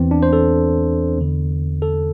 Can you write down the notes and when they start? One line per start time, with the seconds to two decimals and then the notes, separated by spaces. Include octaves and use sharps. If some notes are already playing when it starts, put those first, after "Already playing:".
Already playing: E2 E3 C4
0.11 D4
0.23 C5
0.33 A4
1.18 E2 D3
1.82 A4